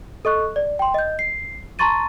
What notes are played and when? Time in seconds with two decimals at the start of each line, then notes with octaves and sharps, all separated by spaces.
0.25 A4 D#5 C#6 F#6
0.56 D5
0.79 G5 C6
0.94 D#5 G6
1.19 C7
1.79 A5 A#5 C6 C#6 A6 D#7